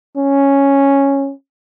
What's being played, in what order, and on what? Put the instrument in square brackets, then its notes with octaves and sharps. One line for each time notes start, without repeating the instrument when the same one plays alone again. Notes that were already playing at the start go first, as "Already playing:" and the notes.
[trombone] C#4